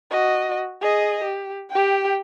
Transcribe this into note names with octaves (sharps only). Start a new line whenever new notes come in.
F#4 D#5
G#4 D#5
G4
G4 G5